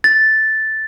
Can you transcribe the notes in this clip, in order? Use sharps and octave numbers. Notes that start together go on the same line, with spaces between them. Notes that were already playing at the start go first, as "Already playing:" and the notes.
A6